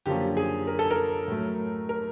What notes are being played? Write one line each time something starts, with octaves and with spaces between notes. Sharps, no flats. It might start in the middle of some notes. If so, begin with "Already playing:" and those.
F#2 D3 F3 A#3 C#4 G4
G#4
A#4
A4
A#4
A2 F#3 A3
A#4